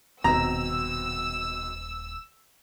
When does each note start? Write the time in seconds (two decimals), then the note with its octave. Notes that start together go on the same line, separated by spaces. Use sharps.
0.24 D#1 G#1 B2 C4 A#5 E6